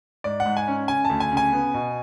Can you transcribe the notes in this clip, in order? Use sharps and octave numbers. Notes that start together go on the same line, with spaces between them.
G#2 D5
F#5
G#2
G#5
C#4
C#3 G#5
D2 A5
G#5
C#3
G#5
B3
B2